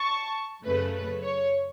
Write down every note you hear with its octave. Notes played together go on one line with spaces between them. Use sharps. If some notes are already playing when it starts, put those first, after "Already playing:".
Already playing: A5 C#6
F#2 C#3 A3 B4
B4
C#5